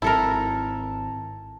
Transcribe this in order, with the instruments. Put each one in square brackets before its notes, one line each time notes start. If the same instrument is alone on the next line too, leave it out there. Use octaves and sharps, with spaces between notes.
[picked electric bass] G#1 [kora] E4 A4 A#4 [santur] A5